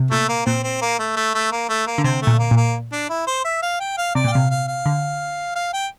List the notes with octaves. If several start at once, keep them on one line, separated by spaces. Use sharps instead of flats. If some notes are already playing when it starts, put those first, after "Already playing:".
Already playing: C3
A#2 A3
A#3
A#2 C4
C4
A#3
A3
A3
A3
A#3
A3
A#3
D3
C3 C4
A3
A#2
A#3
A#2
A#3
D4
E4
C5
E5
F5
G5
F5
C3 D5
A#2 G5
C3 F5
F5
F5
D3
F5
G5